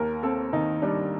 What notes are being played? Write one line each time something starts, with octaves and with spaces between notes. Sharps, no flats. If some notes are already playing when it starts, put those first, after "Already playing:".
Already playing: D#2 A#4
C4 A4
D#3 D#4
G3 D4